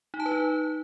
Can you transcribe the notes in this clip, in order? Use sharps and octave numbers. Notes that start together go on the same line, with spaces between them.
D#4
A5
B4
D#4